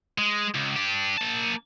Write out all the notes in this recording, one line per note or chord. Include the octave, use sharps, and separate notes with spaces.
G#3
C#2
D4 G4
A#3 A5